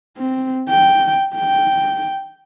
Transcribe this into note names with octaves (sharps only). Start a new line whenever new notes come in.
C4
G5
G5